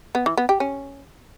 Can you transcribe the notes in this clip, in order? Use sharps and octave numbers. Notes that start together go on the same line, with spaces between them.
B3
E3
B3
G4
C#4